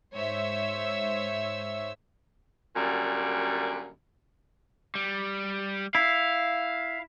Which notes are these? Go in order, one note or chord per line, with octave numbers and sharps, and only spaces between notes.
G#2 C5 C#5 E5 E6
F#2 A#2 D3 G3
G3
E4 F5